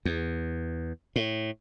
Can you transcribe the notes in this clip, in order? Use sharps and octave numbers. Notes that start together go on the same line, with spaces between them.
E2
A2